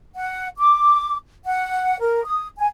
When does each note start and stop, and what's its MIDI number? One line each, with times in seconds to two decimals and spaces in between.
0.15 0.49 78
0.58 1.15 86
1.45 1.99 78
2.01 2.23 70
2.25 2.48 87
2.58 2.66 80